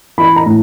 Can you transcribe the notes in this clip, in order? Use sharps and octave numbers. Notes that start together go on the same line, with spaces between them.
E3 B5
A#5
A2